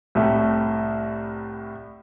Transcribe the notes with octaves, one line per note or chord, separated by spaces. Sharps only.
C2 A2 A3